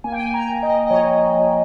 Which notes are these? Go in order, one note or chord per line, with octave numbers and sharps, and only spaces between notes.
A#3 G#5
G5
G#5
A#5
A#3
D#5
D#5
F3 C#5
F3